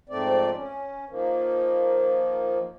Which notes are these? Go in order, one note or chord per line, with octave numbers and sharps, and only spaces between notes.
F2 G#2 A3 C4 D5
C#4
D#3 F3 A#3